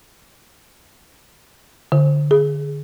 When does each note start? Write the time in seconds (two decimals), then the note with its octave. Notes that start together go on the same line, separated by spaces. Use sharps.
1.92 D3
2.31 G#4